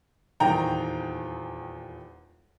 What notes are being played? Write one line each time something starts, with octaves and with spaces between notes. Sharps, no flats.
D#1 E2 D#3 G5 A#5